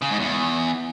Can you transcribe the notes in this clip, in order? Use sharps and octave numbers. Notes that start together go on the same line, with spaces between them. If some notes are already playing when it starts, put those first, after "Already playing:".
C#3
G#2
E2